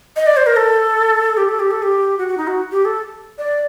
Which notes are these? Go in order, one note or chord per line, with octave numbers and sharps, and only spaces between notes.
D#5
D5
C5
A#4
A4
G4
A4
G4
A4
G4
F#4
F#4
D#4
F#4
G4
A4
D5